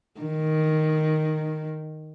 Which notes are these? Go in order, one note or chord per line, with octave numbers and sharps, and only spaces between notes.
D#3